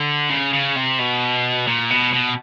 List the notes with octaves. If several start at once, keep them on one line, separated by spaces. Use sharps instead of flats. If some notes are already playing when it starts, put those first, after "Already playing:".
Already playing: D3
C#3
C#3
C3
B2
A#2
B2
B2